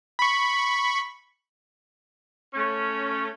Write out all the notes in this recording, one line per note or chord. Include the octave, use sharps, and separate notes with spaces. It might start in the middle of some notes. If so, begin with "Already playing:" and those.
B5 C#6
A3 C#4